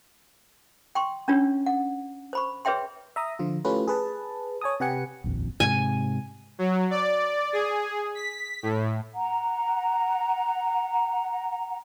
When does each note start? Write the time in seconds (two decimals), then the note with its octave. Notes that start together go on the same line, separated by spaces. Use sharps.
0.95 G5 C6 C#6
1.28 C#4 D4 F4 C#5
1.66 F#5
2.33 C5 B5 C#6
2.65 G#4 B4 C#5 E5 G5 C6
3.16 E5 A#5 D#6
3.39 D3 F3 F4
3.65 A3 C#4 E4 F4 G4 B4
3.88 G#4 B4 A5
4.61 C#5 G#5 A5 D#6
4.80 C3 G4 B4 F#5 G#5 C#7
5.24 D#1 A#1 F2
5.60 G#2 C3 G#5
6.59 F#3
6.91 D5
7.53 G#4
8.15 B6
8.63 A2
9.14 F#5 A#5